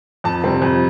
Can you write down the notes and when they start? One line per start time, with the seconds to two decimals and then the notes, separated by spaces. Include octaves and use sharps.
0.24 F2 A5
0.44 C3 G3 C4
0.62 F2